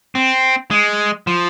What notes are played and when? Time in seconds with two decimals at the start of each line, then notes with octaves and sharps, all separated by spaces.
0.15 C4
0.71 G#3
1.27 F3